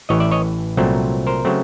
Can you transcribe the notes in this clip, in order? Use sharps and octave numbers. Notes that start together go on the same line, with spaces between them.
A1 A2 E3 C#5 D#5
D5 E5
C#5 D#5
C2 A#2 F#3 A3 C4
A#4 C5
C#3 F#3 A3 C4